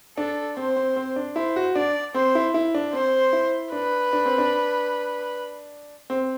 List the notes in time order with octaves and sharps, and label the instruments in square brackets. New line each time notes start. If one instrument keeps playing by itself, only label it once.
[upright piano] D4 [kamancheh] A4
[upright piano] C4 [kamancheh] C5
[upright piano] C4
C4
D4
[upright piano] E4 [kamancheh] C5
[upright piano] F#4
[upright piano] D4 [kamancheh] D5
[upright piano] C4 [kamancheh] C5
[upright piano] E4
E4
D4
[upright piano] C4 [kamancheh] C5
[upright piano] E4
[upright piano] D4 [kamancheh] B4
[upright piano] D4
C4
D4
C4